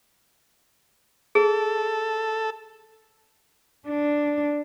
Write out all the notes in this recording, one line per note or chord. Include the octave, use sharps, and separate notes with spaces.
G#4 A4
D4